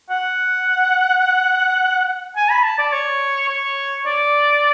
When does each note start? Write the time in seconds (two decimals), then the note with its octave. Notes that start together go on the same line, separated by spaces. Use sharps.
0.10 F#5
2.36 G#5
2.50 B5
2.64 A5
2.79 D5
2.93 C#5
3.48 C#5
4.06 D5